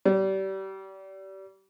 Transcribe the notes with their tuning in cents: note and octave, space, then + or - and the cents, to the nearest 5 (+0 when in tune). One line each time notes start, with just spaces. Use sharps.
G3 -30